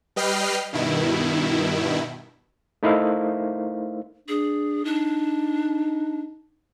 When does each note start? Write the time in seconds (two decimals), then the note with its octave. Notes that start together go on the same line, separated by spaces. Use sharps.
0.16 G3 B4 D#5 G5 F6 C7
0.73 G2 B2 D#3 E4
2.83 A3 D#4 E4 A#4 C5 F5
4.28 D4 G#4
4.85 D4 D#4